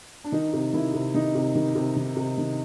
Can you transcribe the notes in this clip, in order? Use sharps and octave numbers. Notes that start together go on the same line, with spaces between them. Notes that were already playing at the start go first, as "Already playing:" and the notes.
D4
D#3 D#4
C3
D#3 E4
C3
D#3 D#4
C3
D#3
C3
D#3
C3
D#3